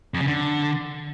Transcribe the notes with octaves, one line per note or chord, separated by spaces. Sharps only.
F2
C#3
D3